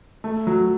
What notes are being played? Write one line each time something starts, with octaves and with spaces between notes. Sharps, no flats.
A3
F#3